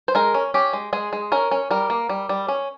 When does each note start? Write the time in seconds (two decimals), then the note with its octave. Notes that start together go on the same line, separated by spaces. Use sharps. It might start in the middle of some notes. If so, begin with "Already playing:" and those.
0.08 C5
0.15 G#3 A#4
0.34 C#4
0.54 C#4 G4
0.73 G#3
0.93 G#3 G#4
1.13 G#3
1.32 C#4 A#4
1.51 C#4
1.71 G3 A#4
1.90 A#3
2.09 G3
2.29 G3
2.48 C#4